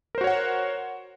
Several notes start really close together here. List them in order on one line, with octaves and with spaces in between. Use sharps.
A#4 C5 F#4 C#5 F#5